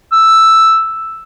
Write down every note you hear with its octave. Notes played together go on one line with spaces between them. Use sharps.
E6